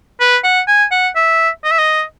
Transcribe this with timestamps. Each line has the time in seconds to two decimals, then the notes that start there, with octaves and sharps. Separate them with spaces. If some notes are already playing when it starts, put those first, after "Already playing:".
0.20 B4
0.44 F#5
0.68 G#5
0.91 F#5
1.16 E5
1.64 D#5
1.71 E5
1.79 D#5